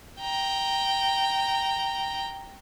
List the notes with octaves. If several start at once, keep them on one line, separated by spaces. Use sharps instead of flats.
G5 A#5